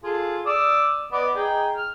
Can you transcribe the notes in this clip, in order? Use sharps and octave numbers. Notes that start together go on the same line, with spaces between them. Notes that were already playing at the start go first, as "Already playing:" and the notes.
F4 G#4 A4
D5 D#6 E6
B3 D5 D#5
D#4 G#4 G5
F6